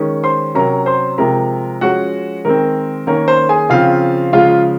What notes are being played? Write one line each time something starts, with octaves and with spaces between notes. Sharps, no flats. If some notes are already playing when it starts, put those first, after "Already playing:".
Already playing: D#3 G#3 C#4
C5 C6
C3 F#3 C#4 A#4 A#5
C5 C6
C3 F3 G#3 C4 A#4 A#5
F3 G#3 C#4 F#4 F#5
D#3 G#3 C4 A#4
D#3 A#3 C#4 A#4
C5
G#4 G#5
C#3 F3 C4 F4 F5
C#3 F3 G#3 F4 F5